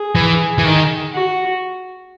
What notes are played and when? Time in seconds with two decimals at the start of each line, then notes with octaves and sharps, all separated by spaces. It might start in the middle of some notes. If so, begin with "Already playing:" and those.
Already playing: G#4
0.15 E3
0.58 E3
0.65 D#3
1.13 F#4